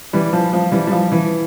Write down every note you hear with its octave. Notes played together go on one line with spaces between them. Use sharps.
E3 G3
F3
F3
E3 G3
G3
F3
E3